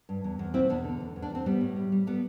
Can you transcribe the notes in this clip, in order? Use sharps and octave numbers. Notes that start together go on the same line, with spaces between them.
G2
E2
E2
B2 C4 E4
E2 B3 D4
D3
E2
E2
D4
E2 C4
G3 B3
A2
G3
G3
G3 B3